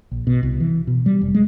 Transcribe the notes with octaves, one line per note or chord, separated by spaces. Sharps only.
A#1
B2
C2
E3
B2
G3
F1
G#3